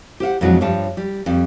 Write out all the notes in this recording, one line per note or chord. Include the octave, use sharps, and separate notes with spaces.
G4 C5 F5 F#5
F2 B2 E3 F#3 G#3 D4
G2 F3 G3 C#5 A5
G3
F2 G3